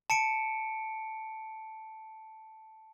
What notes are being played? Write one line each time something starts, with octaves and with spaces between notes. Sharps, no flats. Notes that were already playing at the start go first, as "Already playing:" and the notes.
A5 C#7 D7